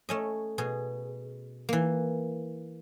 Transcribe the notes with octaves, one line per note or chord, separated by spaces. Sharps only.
A3 C#4 D#5
B2 G#4
E3 A#3